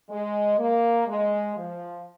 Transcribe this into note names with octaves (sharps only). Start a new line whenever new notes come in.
G#3
A#3
G#3
F3